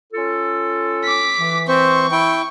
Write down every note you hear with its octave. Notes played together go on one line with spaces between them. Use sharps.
C#4 F4 A4
D6 B6
E3
C4 C5 C#6
E4 G5